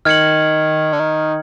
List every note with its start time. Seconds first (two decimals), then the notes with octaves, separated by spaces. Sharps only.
0.05 D#3 F6 G#6 C#7 F#7
0.93 D3
1.00 D#3